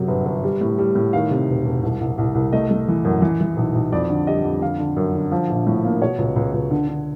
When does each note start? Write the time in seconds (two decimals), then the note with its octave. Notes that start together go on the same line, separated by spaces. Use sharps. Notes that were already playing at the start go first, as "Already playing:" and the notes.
Already playing: F#2 C3 F#3
0.08 G1
0.26 G1
0.44 G3
0.61 A2
0.78 G3
0.95 A2
1.13 D#3 F5
1.31 C3
1.49 E1
1.66 E1
1.83 C2
2.01 C2
2.18 C2
2.35 C2
2.53 A3 D#5
2.70 A3
2.88 E3
3.05 F#2
3.22 E3
3.41 E3
3.57 B1
3.75 B1
3.92 F2 D5
4.10 D3
4.27 G3 D#5
4.44 F2
4.62 D3 F5
4.79 D3
4.97 F#2
5.15 D3
5.32 F3
5.50 A#1
5.67 A2
5.85 A#3
6.01 B2 C#5
6.18 C#2
6.36 C#2
6.53 C#2
6.71 D3
6.88 D3